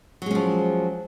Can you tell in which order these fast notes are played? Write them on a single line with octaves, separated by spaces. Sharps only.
F#3 G#3 C#4 F3